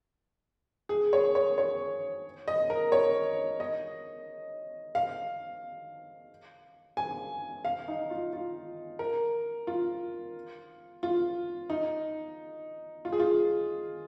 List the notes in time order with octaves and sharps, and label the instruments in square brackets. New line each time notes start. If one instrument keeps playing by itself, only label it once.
[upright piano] G#4
C#5
C#5
C#5
D#5
A#4
C#5
D#5
F5
G#5
F5
D#4
F4
F4
A#4
F4
F4
D#4
F4
G#4
F4